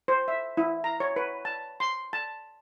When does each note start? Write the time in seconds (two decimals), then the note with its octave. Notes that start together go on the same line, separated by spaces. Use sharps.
0.08 C5
0.28 E5
0.57 E4
0.84 A#5
1.00 C#5
1.16 B4
1.45 A5
1.80 C6
2.13 A5